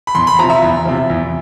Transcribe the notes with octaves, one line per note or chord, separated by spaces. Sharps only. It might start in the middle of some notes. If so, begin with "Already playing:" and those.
B5
E2 C6
B5
C3 F3 A#5
E5
E2
C3 F3
E2